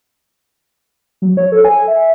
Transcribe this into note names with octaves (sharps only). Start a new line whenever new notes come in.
F#3
C#5
A4
G#5
E5